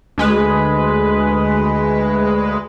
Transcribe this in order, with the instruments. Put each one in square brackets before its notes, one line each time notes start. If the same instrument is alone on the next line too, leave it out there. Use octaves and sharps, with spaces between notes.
[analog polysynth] D2 G#3 B4